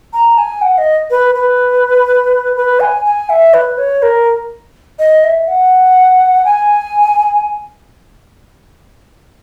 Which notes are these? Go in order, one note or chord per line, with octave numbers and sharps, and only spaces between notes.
A#5
G#5
F#5
D#5
B4
B4
B4
G#5
G#5
E5
B4
C#5
A#4
D#5
E5
F#5
G#5